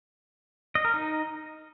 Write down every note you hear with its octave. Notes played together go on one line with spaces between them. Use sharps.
D#5
A#4
D#4